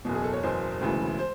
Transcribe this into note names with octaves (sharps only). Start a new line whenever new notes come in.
F#1 E2 B2
G#4
A4
C#5
F#1 E2 B2 C5
E1 D2 C#3 E3
C5